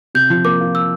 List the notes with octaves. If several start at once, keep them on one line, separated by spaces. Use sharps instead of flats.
C3 G6
F3
A#3 D6
F4
E6